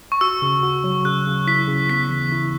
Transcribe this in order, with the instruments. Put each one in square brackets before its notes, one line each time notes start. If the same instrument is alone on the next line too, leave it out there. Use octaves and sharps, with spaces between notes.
[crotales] C#6
[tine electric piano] F#4 [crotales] E6
[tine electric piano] C#3
F#4
F#3
[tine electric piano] C#3 [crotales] F#6
[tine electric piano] C#3
[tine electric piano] E4 [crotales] B6
[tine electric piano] C#3
[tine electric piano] B3 [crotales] B6
[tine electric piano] E3
E4